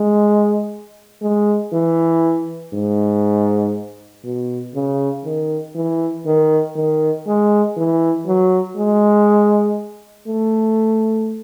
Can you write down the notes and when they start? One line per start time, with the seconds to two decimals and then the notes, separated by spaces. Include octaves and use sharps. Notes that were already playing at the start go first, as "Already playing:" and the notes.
Already playing: G#3
1.22 G#3
1.73 E3
2.74 G#2
4.24 B2
4.75 C#3
5.24 D#3
5.75 E3
6.26 D#3
6.75 D#3
7.27 G#3
7.77 E3
8.26 F#3
8.77 G#3
10.27 A3